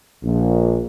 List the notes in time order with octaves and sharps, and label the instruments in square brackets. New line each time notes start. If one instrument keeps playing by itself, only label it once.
[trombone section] A#1